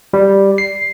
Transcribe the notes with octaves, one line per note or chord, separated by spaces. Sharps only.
G3
C7